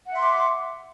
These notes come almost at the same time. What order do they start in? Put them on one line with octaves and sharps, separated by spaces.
F#5 E5 C6 D6